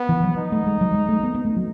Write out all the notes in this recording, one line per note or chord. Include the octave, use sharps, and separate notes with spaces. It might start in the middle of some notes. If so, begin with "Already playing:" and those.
Already playing: B3
E3
F#3
D#4
A3
G#3
F#3
G#3
A3
B3
B3
A3
F#3